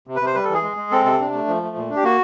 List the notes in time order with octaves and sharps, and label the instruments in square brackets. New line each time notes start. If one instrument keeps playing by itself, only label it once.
[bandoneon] C3
B4
C3 C5
G3 B4
A4
E3
G#4
G#3
G#3
C4 A4
C3 A4
D4
A3
F3
A3
A#2
D4
G4
A#3 F#4